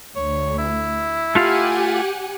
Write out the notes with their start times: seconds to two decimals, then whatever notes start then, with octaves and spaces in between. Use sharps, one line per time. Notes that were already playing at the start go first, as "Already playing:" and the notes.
0.16 D2 C#5
0.58 E4
1.35 A3 F4 G4 F5 F#5 G#5